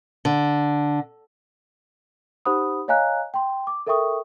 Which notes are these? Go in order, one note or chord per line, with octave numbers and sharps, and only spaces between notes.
D3
D#4 G4 C5 F#5 B5 D#6
C#5 D#5 F5 G#5 A#5 F#6
G5 C6
D6
A4 A#4 E5 G5 C#6 D#6